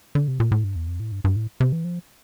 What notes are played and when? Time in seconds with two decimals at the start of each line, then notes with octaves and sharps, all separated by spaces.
0.15 D3
0.28 C3
0.40 A#2
0.52 A2
0.64 G2
0.76 E2
0.88 F2
1.00 A2
1.12 G2
1.24 G2
1.36 A2
1.60 C3
1.72 E3
1.85 F3